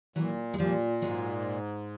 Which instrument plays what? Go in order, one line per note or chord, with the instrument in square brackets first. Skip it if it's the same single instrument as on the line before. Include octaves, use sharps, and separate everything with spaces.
[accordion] A#2 [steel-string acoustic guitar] E3 F#3
[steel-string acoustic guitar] G#3
[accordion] A#2 [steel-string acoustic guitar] F3 G3
[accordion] G#2 [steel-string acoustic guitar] F#3 G#3